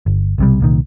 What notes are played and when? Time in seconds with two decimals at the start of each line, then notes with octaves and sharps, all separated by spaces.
0.06 G1
0.38 B1 C3 G3
0.60 C2 A#2 D#3